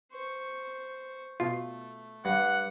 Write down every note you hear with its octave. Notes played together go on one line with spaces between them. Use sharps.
C5 C#6
B2 A3 F4
G2 F#5